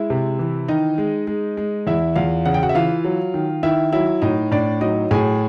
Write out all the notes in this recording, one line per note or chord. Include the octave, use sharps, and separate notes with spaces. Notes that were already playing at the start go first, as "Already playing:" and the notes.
Already playing: G#3 E4 E5
C3
E3
D#3 D#4 D#5
G#3
G#3
G#3
E2 E4 E5
E2 F4 F5
C#3 F#5
G5
F#4 F#5
E5
E3 F4 F5
F#3
D#3
D#3 E4 E5
F#3 E4 E5
A2 D#4 D#5
A2 D4 D5
F#3 D#4 D#5
A2 G#4 G#5